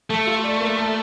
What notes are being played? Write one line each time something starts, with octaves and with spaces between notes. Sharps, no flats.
A3 A4
F4
D5
A#3
A4